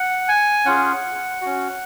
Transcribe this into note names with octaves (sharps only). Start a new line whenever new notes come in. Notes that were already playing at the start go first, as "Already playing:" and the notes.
Already playing: F#5
G#5
C#4 F4 G#4 F#5
C#4 F#4